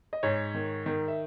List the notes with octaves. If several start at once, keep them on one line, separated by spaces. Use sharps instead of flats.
D#5
G#2 C#5
D#3
D#3
E5